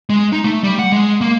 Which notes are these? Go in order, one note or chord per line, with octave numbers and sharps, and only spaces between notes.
G#3
D#4
A3
G3
F#5
G#3
A#3